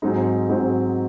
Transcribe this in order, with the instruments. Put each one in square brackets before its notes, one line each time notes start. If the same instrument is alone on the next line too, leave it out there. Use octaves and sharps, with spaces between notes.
[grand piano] G#2 F#3 C4 D#4 G#4
G#2 F#3 C4 D#4 G#4